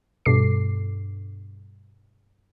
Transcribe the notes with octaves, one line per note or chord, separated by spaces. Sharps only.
G2 B2 A4 D6 C7